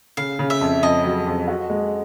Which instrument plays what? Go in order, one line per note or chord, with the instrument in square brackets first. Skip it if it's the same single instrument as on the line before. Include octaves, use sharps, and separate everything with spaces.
[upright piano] C#3 [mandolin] F5
[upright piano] C#3
[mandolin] E5
[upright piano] F2
[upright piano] F2 [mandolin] D#5
[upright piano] F#3
F2
F#4
G#3